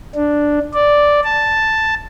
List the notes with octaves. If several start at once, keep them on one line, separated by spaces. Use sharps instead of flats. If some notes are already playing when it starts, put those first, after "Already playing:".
D4
D5
A5